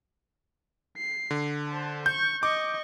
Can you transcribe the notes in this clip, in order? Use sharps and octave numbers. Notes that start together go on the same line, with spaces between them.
C7
D3
C5 A5
C#6 G6
D#5 C#6 D6